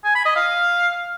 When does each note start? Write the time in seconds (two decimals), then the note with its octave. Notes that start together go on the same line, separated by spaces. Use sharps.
0.05 G#5
0.15 B5
0.26 D#5
0.36 F5